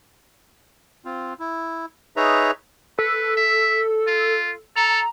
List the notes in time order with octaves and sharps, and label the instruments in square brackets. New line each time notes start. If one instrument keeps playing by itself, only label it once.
[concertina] C4 F4
E4
D#4 G#4 B4 C#5 E5 A#5
[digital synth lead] A4 [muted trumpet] B4
[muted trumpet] E5
F4
[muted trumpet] A4 [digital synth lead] A#5